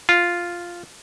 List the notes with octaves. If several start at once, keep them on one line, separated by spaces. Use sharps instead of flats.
F4